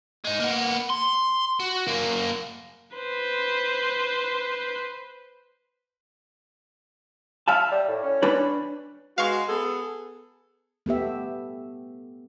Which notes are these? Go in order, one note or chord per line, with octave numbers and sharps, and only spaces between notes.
G#3 D#4
A#3 B3
C6
F#4
F#2 A#3
B4 C5
E5 F5 A5
G3
A2
C#4
D4 B4 D5
G#3 B3 F#4 F5 C#6
B3 G#4 A4
A3 B3 G4 E5